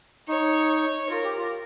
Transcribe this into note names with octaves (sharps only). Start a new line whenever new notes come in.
D#4 C#5
F4 A#4
G4
F4